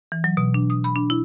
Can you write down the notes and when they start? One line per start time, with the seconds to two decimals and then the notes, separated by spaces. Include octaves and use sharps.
0.12 E3
0.24 F#3
0.37 B2
0.54 D4
0.70 D#6
0.84 B5
0.96 D4
1.10 E4